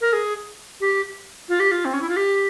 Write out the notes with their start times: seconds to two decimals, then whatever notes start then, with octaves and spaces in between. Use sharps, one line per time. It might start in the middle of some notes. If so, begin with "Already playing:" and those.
0.01 A#4
0.13 G#4
0.81 G4
1.49 F4
1.60 G4
1.71 F4
1.85 C4
1.93 C#4
2.01 E4
2.09 F4
2.17 G4